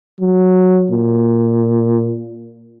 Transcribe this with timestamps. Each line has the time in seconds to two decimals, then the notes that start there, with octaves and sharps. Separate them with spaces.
0.21 F#3
0.91 A#2